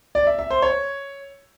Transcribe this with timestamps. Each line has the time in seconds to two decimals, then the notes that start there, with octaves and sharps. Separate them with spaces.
0.15 D5
0.27 E5
0.39 E5
0.50 C5
0.62 C#5